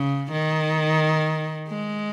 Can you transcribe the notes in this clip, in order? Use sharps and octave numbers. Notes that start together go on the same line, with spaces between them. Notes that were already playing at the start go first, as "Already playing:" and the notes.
Already playing: C#3
D#3
G#3